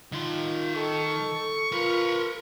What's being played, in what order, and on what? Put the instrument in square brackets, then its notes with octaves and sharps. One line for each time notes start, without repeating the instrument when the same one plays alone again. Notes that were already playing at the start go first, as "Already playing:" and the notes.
[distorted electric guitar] D#3 C6 [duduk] F4
[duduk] A4 [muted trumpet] C#6
[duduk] F4 [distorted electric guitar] A#4 B4